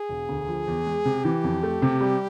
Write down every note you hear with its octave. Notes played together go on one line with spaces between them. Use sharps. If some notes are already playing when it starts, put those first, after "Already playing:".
Already playing: G#4
E1
D2
F3
E2
G#3
C3
E3 G4
F2
A3
C3
G3